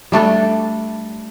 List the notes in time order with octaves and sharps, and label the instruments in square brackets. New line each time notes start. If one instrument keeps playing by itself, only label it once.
[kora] G3 A3 D4 A4